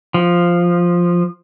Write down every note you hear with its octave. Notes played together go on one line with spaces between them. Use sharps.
F3